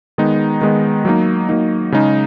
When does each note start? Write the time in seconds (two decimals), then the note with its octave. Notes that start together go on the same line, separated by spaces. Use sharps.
0.18 D#3 G#3 B3 D#4
0.61 D#3 G#3 B3 D#4
1.05 F#3 A#3 D#4
1.49 F#3 A#3 D#4
1.92 C#3 G#3 D#4